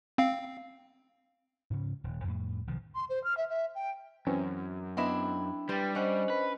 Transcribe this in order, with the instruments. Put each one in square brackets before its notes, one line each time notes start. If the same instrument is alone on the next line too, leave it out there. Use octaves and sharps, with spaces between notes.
[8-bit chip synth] C4 F5
[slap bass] G#2 C#3 C#4
D#1
F2 A2
B1 D#3 F3
[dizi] C6
C5
F6
E5
E5
G5
[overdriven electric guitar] F#2 [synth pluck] E3 C4 C#4
[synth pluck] B3 D#5 E5 [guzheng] C4 D4 E4
[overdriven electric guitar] G3 [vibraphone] B4 G5 [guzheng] C5 [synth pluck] G6 A6
[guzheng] C#4 F#5 [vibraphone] C5 D#5
[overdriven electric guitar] B4